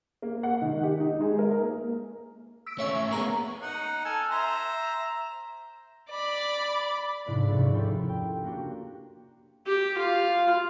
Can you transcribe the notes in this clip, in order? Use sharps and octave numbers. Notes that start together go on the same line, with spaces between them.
A#3
F#5
D#3
G4
D#4
G#3
A#4
A#3
E6 B6 D7
A3 C#4 C#5 E5 C#6
A#3 B3 G#4 A#5 F#7
D#4 F#5
A4 G#5 F6
C5 E5 A#5
D5 B5
F1 G#2 D4 E4 F4 D5
F1 D#2 C#6
C#4 E4 F4 G4 A4
G5
A#3 D4 F#4 G4
G4
F4